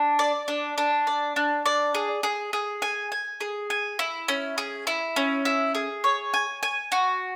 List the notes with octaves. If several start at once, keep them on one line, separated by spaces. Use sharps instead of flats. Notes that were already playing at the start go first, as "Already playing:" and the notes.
Already playing: D4
D5
D4
D4
D5
D4
D5
G#4
G#4
G#4
G#5
G#5
G#4
G#5
E4
C#4
G#4
E4
C#4
E4
G#4
C#5
G#5
G#5
F#4